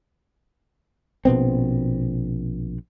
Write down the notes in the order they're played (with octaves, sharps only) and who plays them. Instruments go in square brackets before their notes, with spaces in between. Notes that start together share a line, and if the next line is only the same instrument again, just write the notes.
[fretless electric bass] A#1 B2 B3 C4